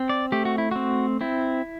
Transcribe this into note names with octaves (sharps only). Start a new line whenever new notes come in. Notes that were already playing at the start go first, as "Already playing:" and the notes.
Already playing: C4
D5
A3 G4
F#4
E4
C4 F#4
C4 E4